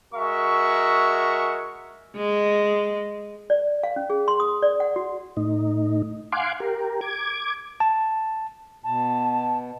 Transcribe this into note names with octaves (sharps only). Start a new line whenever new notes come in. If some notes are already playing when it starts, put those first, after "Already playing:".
G#3 F#4 A#4 E5 C#6
G#3
D5
F5
C#4
G#4
C6
D#6
D5
F#5
F#4
A2 D#4
F5 F#5 G#5 C6 D6
G4 A#4
D6 G#6
A5
B2 A5